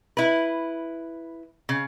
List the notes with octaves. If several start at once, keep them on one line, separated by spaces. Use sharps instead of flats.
E4 B4
C#3